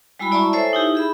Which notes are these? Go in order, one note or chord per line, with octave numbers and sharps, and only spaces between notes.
G3 G#3 E4 F#4 B5
E4 D5 E5 A5 A#5 C#6
A4 C5 C#5 E5 G#5
D#4 E4 G4
G#4 E5 B5